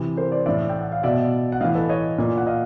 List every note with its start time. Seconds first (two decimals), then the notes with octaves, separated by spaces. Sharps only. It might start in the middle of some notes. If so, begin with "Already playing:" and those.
Already playing: C3 E3
0.17 A#4 C5
0.32 C5 D5
0.46 A2 E3 D5 E5
0.69 G5
0.81 F#5
0.92 F5
1.03 B2 D5 E5
1.52 F#5
1.61 A2 E3 D#5 F5
1.75 A4 B4
1.89 C#5 D#5
2.18 A#2
2.38 F#5
2.47 D#5 F5